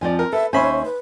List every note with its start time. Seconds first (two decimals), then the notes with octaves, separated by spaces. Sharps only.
0.01 F2 F3 D5 G5 G#5
0.19 A#4
0.33 A4 B4 E5
0.53 D#2 C#4 C5 E5 G#5 B5 C6
0.85 B4